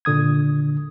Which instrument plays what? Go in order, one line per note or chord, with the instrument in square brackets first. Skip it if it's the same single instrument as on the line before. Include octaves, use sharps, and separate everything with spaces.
[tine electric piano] A#2 D3 D#6 G#6